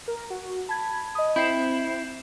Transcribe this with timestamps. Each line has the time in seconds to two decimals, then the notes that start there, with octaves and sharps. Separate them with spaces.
0.08 A#4
0.30 F#4
0.69 A5 B5 G#6
1.15 D#5 D#6
1.36 C4 E4 G6 C7 E7